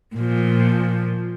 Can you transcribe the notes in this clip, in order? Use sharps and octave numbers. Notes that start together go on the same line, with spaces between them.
A#2 F3